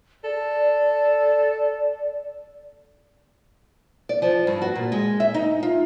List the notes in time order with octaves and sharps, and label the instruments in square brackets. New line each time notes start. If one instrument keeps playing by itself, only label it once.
[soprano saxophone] A4 [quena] D5
[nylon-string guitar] D5
F3
G2
F#4
A#2
G#3
E5
D#4
F4